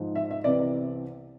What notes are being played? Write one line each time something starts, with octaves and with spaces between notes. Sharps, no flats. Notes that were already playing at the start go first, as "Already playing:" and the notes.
Already playing: G#2 F3 G#3
E5
E5
C2 C3 E3 B3 D5